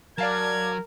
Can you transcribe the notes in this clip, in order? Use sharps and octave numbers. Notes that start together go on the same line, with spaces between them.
F#3 A#4 D5 F5 A5 G#6